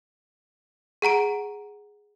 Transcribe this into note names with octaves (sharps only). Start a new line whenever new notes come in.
G#4 F#5 A#5 D7